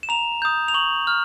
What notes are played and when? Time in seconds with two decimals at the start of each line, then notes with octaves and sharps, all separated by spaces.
0.03 E7
0.09 A#5 F7
0.42 D#6 G6
0.68 F7
0.74 C#6 F#7
1.07 F6